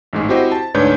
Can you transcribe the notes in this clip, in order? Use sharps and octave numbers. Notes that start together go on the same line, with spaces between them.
A1 G#2 G#3
C4 E4 F#4 G4 C5 D#5
A5
D2 G#2 D4 B4 C#5 G6